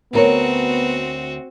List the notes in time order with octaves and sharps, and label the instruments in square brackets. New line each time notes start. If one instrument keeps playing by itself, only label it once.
[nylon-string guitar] D2 A#4 C#5 [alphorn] B3 [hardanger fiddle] C4 F#4